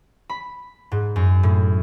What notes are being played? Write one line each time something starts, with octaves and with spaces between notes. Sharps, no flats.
B5
G#2
F#2
A2